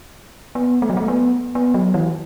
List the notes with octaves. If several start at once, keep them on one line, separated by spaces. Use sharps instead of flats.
B3
A3
F#3
A3
B3
B3
F#3
E3